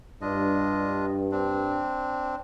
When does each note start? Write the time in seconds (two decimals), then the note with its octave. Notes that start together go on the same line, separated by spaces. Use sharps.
0.22 G2 D4 F4 D#5
1.32 C4 D4